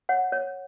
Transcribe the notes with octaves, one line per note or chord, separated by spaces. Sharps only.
C#5 F#5
C#5